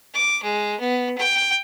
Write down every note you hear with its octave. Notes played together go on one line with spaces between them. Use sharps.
D6
G#3
B3
G5